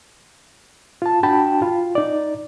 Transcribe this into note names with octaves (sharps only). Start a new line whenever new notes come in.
F4 A5
D4 F#4 G5 A5 B5
F4
D#4 D5